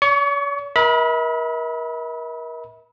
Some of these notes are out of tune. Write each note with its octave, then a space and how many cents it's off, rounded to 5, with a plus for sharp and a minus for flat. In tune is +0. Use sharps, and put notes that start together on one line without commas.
C#5 +45 C#6 +15
A#4 +35 E5 -45 B5 -20